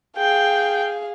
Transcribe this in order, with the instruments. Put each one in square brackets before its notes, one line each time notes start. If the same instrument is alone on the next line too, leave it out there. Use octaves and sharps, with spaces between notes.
[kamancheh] G#4 F5 [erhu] G5